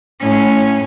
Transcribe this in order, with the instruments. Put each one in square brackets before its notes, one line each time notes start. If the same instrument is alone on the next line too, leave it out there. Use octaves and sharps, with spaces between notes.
[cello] A2 C#4